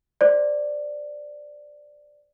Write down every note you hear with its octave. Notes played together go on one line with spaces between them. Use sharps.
C5 D5